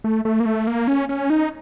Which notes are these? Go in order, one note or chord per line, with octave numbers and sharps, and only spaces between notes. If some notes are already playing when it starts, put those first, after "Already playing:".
A3
A3
A#3
A3
A#3
C#4
C#4
D#4